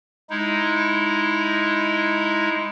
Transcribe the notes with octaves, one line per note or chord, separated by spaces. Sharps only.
G#3 D#4 E4